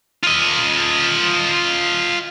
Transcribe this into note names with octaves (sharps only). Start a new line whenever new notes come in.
F4 D#5